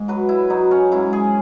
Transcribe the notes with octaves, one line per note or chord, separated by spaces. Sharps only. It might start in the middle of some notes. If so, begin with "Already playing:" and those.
Already playing: G#2
F#3 B4
E4
F#3 D#4
C#4
G#2 E4
G#4